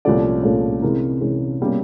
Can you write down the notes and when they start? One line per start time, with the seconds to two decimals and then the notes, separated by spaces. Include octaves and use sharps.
0.05 C2 A#2 F3 A3 C#4 D5
0.43 C2 A#2 F3 A3 C#4 C#5
0.82 C3 E3 G#3 C#4 A#4
1.21 C3 E3 G#3 C#4
1.61 B2 G3 A#3 C#4